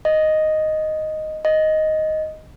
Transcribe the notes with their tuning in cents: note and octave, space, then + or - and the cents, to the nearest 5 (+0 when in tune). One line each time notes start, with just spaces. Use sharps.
D#5 +0
D#5 +5